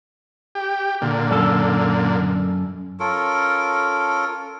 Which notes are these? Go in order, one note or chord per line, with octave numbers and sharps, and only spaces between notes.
G4
A#2 D3
F#2 A4
C#4 F4 A4 A#4